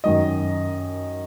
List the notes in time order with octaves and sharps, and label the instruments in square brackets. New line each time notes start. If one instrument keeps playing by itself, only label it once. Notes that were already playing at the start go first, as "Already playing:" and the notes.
[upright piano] F#2 D#3 F#3 D#5